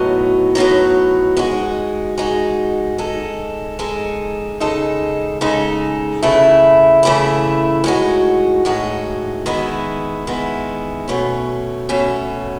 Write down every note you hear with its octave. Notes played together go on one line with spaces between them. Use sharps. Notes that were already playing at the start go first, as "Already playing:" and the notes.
Already playing: A2 F#3 B3 D#4
A2 F#3 B3 D#4
G#3 D#4 F#4
G#3 D#4 F#4
G#3 D#4 A4
G#3 D#4 A4
C#3 G#3 D#4 A4
C#3 G#3 D#4 A4
C#3 E3 A3 E4
C#3 E3 A3 E4
A2 G#3 D#4 F#4
A2 G#3 D#4 F#4
D#3 G#3 B3 E4
D#3 G#3 B3 E4
B2 A3 C#4
B2 A3 C#4